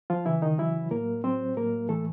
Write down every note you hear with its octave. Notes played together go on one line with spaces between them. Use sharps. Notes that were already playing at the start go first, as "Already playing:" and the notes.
F3 F4
C#3 E3 E4
D#3 D#4
E3 F#3 E4
A2 A#3 A#4
F#3 C4 C5
A2 A#3 A#4
E3 A3 A4